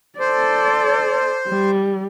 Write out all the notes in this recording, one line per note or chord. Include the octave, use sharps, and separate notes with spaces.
A4 C5 D5
G3